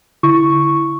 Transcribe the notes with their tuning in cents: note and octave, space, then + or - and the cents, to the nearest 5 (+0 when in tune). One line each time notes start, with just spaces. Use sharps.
D3 -20 E4 +5 C#6 +0